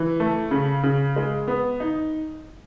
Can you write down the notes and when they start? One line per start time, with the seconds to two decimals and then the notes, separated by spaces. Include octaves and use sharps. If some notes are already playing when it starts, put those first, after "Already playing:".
Already playing: E3
0.20 A3
0.51 C#3
0.83 C#3
1.16 G#3
1.48 B3
1.80 D#4